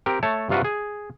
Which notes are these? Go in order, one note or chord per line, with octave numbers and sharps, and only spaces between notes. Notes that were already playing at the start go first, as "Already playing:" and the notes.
C4 G4 A#4
A3 C#5 A5
G2 C3 F4 F#4 B4
G#4